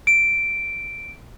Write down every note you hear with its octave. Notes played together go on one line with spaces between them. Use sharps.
D7